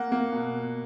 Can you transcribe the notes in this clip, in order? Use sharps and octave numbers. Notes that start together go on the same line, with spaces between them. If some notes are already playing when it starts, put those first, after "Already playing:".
Already playing: A#3 F#5
A#3
B2